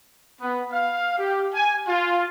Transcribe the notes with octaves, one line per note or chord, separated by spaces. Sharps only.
B3
F5
G4
G#5
F4